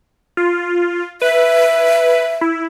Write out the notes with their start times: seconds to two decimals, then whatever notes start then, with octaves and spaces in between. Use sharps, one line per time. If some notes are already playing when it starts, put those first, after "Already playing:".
0.37 F4
1.22 B4 E5
2.41 E4